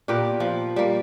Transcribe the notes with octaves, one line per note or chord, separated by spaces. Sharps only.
A#2 B3 G4 A#4
F3
G3 A#3